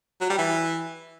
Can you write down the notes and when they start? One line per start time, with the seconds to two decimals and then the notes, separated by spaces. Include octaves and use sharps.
0.21 F#3
0.30 G3
0.38 E3